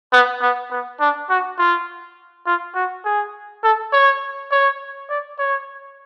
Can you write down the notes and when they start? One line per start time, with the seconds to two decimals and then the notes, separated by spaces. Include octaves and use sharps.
0.13 B3
0.42 B3
0.71 B3
1.00 D4
1.29 F#4
1.58 F4
2.46 F4
2.75 F#4
3.05 G#4
3.63 A4
3.93 C#5
4.51 C#5
5.09 D5
5.39 C#5